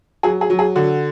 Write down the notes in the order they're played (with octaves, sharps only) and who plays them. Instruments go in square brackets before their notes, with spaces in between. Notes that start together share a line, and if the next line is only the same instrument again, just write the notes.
[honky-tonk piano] F#3 G#4
G#4
F#3
G#4
D3 F#4